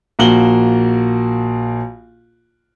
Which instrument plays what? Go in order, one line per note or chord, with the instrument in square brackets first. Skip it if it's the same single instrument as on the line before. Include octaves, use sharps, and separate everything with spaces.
[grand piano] A#1 A#3 F#4 F#7 G7